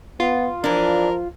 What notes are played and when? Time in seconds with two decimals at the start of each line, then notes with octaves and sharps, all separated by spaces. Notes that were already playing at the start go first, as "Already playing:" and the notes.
0.20 B3 F4
0.64 E3 F3 D4 A#4